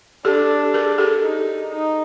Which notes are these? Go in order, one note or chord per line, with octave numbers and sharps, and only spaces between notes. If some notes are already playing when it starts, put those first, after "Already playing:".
D4 G4 A4
G#4 A#4
G4 A4
D#4
D#4